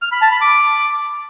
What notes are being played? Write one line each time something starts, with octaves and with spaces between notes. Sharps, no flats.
F6
B5
A5
B5
D6